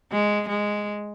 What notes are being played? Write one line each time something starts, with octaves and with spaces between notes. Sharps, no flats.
G#3
G#3